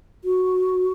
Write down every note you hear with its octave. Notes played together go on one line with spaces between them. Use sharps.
F#4